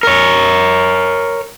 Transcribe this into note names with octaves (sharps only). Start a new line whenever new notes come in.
A#4 C#5